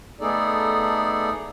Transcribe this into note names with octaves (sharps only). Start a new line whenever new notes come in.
A3 B3 D#4 G#4 A4 D5